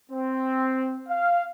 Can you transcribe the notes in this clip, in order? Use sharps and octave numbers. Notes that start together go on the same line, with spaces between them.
C4
F5